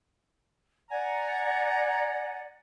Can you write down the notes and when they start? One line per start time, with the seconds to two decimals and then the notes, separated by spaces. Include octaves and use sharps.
0.91 D5 F#5 G#5 A#5